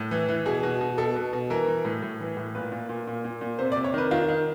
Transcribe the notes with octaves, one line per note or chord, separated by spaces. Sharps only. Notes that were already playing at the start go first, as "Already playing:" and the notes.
Already playing: A2
E3
E3
B2 G#4
B2
B2
B2 A4
B2
B2
E3 A#4
E3
A2
A2
E3
A2
A#2 B4
A#2
A#2
A#2
A#2
A#2
C3 C5
D5
C3
C#5
D#3 B4
D#3 F4
D#3